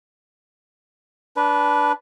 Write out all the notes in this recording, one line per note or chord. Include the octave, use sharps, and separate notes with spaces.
D4 B4